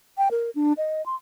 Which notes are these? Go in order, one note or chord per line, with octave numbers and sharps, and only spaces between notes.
G5
A#4
D4
D#5
C6